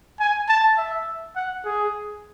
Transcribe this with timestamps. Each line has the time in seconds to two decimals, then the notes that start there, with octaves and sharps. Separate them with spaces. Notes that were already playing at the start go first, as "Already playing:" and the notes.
0.20 G#5
0.48 A5
0.77 E5
1.36 F#5
1.65 G#4